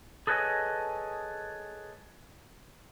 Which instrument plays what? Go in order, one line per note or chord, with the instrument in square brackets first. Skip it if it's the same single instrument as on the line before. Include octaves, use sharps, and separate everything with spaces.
[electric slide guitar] G#4 A4 B4 C#5 D#5 G#5